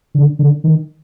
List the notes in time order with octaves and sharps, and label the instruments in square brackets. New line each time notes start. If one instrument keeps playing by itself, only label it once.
[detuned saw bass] D3
D3
D#3